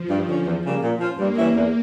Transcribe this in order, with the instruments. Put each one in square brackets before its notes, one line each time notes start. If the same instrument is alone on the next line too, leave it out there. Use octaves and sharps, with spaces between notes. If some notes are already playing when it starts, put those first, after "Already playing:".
Already playing: [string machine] F3
[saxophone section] G2
D3 F3 C#4
E2
C#3 G3 A#3
A#2
F3 C#4 F4
[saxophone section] G2 [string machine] A#3
[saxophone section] E3 G3 C#4 E4
E2